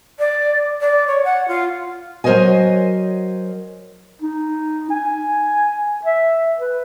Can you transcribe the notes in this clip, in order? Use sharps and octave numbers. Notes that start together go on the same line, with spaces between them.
D5
D5
C#5
F#5
F4
F#3 A#4 C5 C#5 D#5 G#5
D#4
G#5
E5
B4